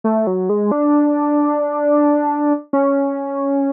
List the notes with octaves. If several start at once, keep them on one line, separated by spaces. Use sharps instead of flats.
A3
F#3
G#3
D4
C#4